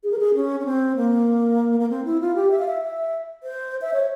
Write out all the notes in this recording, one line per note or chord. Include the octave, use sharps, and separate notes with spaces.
G#4
A#4
G#4
C#4
C#4
C4
A#3
A#3
C4
E4
F4
G4
E5
F5
E5
E5
C5
E5
C#5